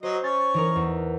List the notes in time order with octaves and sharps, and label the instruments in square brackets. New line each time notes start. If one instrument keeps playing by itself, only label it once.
[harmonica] F#3 D#5 [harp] C5
[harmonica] C#4 C#6 [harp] A6
[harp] E3 D#4 A#4
E2